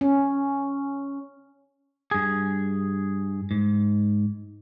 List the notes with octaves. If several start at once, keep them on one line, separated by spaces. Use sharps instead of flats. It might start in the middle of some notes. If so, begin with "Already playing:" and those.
C#4
G2 G#4
G#2